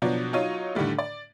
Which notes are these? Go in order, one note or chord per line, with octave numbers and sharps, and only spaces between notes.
B2 F3 F#3 B3 D4
F#3 D#4 F4 C#5 D#7
A2 D3 D#3 G3 A3
D5